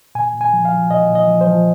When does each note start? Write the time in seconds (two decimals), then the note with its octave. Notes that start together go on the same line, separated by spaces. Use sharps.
0.15 A#2 G#5
0.34 A#2
0.41 G#5
0.53 F3
0.65 F5
0.72 F3
0.91 A#2 D#5
1.09 A#2
1.15 D#5
1.28 F3
1.41 C5
1.47 F3